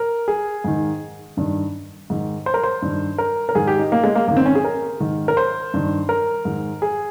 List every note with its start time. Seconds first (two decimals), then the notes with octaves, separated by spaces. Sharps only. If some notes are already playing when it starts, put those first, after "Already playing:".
Already playing: A#4
0.28 G#4
0.64 G#2 D#3
1.37 G2 D#3
2.10 G#2 D#3
2.46 C5
2.54 A#4
2.64 C5
2.82 G2 D#3
3.18 A#4
3.49 A#4
3.55 G#2 D#3 G#4
3.67 G4
3.79 D#4
3.92 A#3
4.04 G#3
4.15 A#3
4.27 G#2 D#3 A#3
4.37 C4
4.46 C#4
4.55 G#4
4.64 A#4
5.00 G#2 D#3
5.28 A#4
5.37 C5
5.74 G2 D#3
6.09 A#4
6.45 G#2 D#3
6.82 G#4